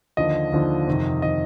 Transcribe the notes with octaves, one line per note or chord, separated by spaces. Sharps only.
D#2 D3 F3 D#5
D#2 D3 F3
F2 C3 D#3
C3 D#3 D#5